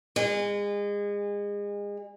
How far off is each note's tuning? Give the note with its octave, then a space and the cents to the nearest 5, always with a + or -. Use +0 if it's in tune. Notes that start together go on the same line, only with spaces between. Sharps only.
G#3 -30